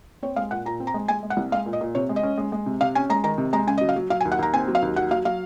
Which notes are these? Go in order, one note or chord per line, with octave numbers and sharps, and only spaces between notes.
C4 C#5
G#3 F5
A#2 F#5
A#2 A#5
C4
A#5
G#3
G#3 G#5
G#3
F#5
C2
G#3 F5
A#2
D#5
A#2
C3 C#5
G#3
D#5
C#4
G#3
G#3
C3
C3 F5
C#4 G#5
G#3 A#5
D#3 A#5
C3
G#3 A#5
C#3 G#5
F#3 D#5
F5
F#3
F#3 F5
G#5
D#2
F#5
D#2 A#5
C4 G#5
F#3
F5
D#2
F#3 F#5
F#3 F5
F#3 F5